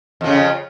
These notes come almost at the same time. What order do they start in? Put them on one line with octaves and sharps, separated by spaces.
F2 F3 C#3